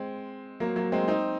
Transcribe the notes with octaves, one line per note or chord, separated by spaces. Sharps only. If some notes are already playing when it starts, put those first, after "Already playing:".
Already playing: G#3 C4
F#3 A#3
F#3 A#3
G#3 C4
C4 D#4